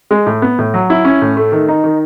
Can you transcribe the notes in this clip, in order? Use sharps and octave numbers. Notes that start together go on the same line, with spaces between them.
G#3
A2
B3
A2
F#3
E4
C#4
A2
A3
D#3
D#4
D#3